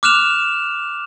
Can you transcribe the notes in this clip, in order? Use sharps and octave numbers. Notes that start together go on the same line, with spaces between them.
D6 F6 F#6 E7 F7